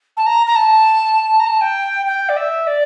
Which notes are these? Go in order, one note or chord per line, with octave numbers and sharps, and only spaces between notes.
A5
A#5
A#5
A5
A#5
A5
G5
G5
D5
E5
D5